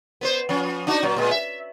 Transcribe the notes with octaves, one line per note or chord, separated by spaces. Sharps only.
B3 B4 C5
F3 C#4
D4 D#4 F#4
A#2 F#3
A#2 G#3
E5